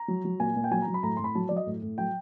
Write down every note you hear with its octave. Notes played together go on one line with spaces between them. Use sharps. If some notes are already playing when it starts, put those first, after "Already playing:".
Already playing: A#5
F#3
F#3
A#2 G#5
A#2
G5
F#3 G#5
A#5
F#3
B5
A2 A#5
A2 C6
B5
F#3 A5
F#3 D5
D#5
A2
A2
F#3 G5